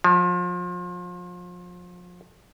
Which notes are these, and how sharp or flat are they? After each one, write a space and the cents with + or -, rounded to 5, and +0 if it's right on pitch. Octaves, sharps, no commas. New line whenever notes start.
F3 +30